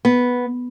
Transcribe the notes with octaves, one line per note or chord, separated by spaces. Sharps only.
B3